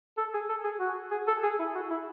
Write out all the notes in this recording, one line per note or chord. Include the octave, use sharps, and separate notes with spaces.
A4
G#4
A4
G#4
F#4
G#4
A4
G#4
E4
F#4
E4